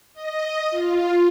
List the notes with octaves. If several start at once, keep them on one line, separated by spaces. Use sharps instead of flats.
D#5
F4